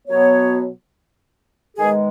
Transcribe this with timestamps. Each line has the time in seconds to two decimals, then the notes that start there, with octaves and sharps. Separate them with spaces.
0.08 B2 F#3 B3 C#5
1.77 D#3 G#3 B3 G#4